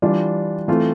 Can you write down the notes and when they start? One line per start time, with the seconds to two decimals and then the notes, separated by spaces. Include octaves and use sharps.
0.02 E3 G3 D4 F4
0.68 E3 A3 C4 F4